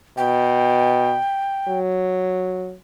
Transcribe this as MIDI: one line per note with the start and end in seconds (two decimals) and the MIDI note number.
0.17 1.15 47
0.17 1.79 79
1.68 2.73 54